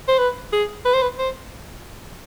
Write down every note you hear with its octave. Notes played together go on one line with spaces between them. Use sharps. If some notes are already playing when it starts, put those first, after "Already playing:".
C5
B4
G#4
B4
C5
B4
C5